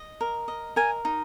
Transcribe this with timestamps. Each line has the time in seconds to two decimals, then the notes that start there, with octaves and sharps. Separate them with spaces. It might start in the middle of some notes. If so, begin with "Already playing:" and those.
Already playing: D#5
0.21 A#4
0.48 D#5
0.76 A#4 G#5
1.05 D#4